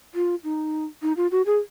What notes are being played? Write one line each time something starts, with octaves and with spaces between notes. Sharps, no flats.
F4
D#4
D#4
F4
F#4
G#4